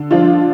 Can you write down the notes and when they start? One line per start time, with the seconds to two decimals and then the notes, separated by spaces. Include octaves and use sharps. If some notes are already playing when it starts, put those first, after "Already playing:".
Already playing: D3
0.11 F3 D4 F4